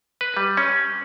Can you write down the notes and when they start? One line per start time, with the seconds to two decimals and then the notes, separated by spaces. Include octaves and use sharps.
0.21 B4
0.37 G3
0.57 C#4